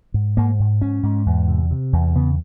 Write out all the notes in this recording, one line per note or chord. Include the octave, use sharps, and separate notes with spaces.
G#2
G#2 A#3
G#2
G#2 C#4
G#2
E2
C3
C3
E2
C#3 B3